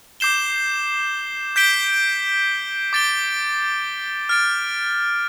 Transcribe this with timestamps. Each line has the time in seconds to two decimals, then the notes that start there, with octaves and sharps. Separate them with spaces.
0.20 D6 G6 C7 E7 G7
1.56 G6 B6 D7 G7
2.93 D6 A6 D7 G7
4.29 F6 A6 D7